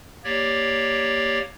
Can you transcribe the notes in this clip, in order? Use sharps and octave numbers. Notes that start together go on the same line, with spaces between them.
A#3 G4 C#5 D5